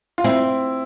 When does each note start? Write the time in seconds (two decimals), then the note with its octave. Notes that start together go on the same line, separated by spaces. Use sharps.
0.18 F4
0.24 C4 E4